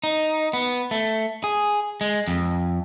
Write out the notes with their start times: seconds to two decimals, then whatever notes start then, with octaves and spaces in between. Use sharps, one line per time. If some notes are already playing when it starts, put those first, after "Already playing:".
0.04 D#4
0.53 B3
0.91 A3
1.44 G#4
2.01 G#3
2.28 F2